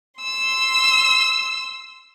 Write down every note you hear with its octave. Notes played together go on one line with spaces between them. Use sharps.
C6 E6